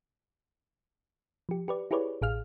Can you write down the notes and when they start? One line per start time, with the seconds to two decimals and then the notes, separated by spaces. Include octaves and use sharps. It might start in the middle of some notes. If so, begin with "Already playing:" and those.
1.49 F3 G4
1.68 G4 B4 D5
1.91 E4 G4 G#4 B4 C#5 D5
2.22 A1 G#4 F5 F6